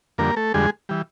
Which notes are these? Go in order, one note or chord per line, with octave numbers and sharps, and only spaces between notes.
F2 D3 G3 A#3 A#4
A3 A4
F2 D3 G3 G#3 G#4
E3 G3